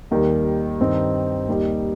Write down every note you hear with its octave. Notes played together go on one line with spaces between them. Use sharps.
D#2 D#3 G3
G2 D#3 C4 D#4
D#2 D#3 G3 D#4